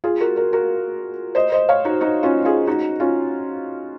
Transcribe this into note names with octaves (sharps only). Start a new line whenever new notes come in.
F4 G#4
F#4 A#4
F#4 A#4
F#4 A#4
C5 D#5
C5 D#5
C#5 F5
D#4 F#4
D#4 F#4
C#4 F4
F4 G#4
D#4 F#4
C#4 F4